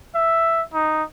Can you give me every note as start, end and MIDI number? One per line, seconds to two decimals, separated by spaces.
0.15 0.62 76
0.74 1.03 63